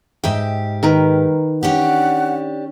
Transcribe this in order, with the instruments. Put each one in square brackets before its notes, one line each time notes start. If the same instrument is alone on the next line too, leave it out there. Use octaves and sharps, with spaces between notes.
[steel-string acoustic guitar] G#2 G4 [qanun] D#5 E5 G5
[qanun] D#3 A#4 B4
[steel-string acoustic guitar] C#4 D4 G4 [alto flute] F#5